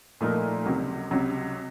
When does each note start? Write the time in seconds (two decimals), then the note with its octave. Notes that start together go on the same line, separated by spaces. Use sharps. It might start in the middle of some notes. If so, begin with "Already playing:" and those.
0.21 A#2 F3 A3 D#4 A#4
0.65 C#2 C3 F#3
1.11 C#2 C3 F#3